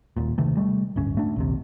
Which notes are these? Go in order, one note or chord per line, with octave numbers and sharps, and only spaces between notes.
D#1 A#2
C3 D#3 A3
G3 A3
D1 G1 C#4
A3 D4
A#1 D#2 C3